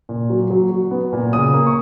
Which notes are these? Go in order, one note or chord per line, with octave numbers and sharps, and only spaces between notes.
A#2
F#3
F#3
F#3
B3
A#2
C#3 D#6
A#3
C#6